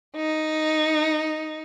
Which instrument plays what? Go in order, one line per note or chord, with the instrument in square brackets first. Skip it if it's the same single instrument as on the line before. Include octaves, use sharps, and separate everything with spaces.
[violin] D#4